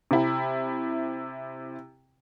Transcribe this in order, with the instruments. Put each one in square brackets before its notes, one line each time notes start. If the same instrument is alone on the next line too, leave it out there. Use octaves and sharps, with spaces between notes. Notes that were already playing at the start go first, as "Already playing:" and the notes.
[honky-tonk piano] C3 E4